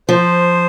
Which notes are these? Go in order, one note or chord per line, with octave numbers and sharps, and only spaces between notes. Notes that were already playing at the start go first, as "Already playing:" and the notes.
F3 C5